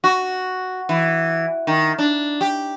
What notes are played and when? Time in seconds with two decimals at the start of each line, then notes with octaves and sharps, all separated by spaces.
0.04 F#4
0.89 E3
1.67 D#3
1.98 D4
2.41 G4